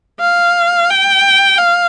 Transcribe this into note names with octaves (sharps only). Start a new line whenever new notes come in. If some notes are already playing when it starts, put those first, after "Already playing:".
F5
G5
F5